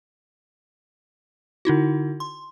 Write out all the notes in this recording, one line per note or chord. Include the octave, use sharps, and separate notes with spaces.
D3 D#4 E4 F#4
C6